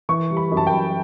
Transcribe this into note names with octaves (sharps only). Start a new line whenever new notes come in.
E3 C#6
G3
B5
F#2
A5
G5
F#2